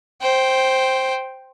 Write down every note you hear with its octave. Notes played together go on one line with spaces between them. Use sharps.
C5 G5